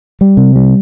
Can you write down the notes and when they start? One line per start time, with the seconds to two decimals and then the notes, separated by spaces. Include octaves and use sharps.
0.21 G3
0.37 C3
0.56 G3